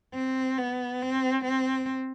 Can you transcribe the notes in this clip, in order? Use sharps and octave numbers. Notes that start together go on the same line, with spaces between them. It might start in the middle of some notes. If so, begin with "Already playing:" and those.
C4
B3
C4
C4